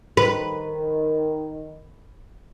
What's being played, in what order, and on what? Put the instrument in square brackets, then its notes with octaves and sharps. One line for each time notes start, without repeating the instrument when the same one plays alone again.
[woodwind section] D#3 [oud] B4